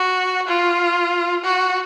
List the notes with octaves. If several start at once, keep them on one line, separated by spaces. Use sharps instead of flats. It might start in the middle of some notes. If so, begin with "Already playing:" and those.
Already playing: F#4
F4
F#4